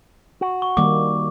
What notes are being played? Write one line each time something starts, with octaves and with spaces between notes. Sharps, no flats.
F#4
C#6
D#3 G3 A#3 D6